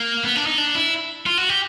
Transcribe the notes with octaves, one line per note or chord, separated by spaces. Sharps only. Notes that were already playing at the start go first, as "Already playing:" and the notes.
Already playing: A#3
B3
D4
D#4
D4
E4
F4
F#4
G4